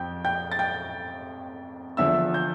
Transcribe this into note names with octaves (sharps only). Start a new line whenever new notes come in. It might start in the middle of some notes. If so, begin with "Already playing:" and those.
Already playing: F2 F3 G5 G6
G5 G6
A6
G5 G6
E2 D3 F3 E5 E6
G6